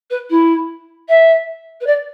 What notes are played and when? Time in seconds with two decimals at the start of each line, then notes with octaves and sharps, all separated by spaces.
0.10 B4
0.30 E4
1.09 E5
1.81 B4
1.87 D5